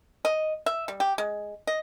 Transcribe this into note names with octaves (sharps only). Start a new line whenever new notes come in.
D#5
E5
G3
G4
G#3
D#5